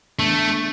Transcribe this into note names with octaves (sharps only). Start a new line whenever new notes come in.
E3 A3 B3 D4